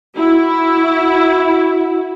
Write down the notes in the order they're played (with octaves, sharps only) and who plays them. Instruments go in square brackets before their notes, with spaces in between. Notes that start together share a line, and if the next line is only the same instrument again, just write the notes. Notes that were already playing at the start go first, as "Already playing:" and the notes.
[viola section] E4 [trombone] F#4